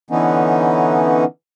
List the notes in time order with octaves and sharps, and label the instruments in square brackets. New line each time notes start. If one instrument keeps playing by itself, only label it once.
[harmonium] D3 E3 B3 C#4 D#4